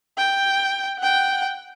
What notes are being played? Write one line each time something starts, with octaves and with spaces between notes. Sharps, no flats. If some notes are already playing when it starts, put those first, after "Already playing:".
G5
F#5 G5